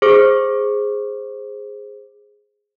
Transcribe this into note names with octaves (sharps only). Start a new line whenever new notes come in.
G#4 C5 D6